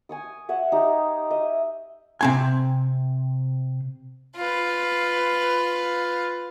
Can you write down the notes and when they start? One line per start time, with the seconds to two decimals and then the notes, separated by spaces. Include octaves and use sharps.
0.09 G#5 C#6 D#6
0.49 C#5 E5 F#5
0.72 D#4 G4
1.30 D#5 E5
2.21 C3 C4 G#5
4.36 F4 B4